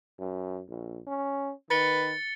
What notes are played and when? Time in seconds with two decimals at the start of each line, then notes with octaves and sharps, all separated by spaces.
0.19 F#2
0.68 A#1
1.07 C#4
1.70 D#3 B4 A6 C#7 G7